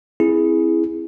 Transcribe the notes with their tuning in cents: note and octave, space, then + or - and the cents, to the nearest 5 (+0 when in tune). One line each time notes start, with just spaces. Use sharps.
C4 +0 E4 +0 G#4 +0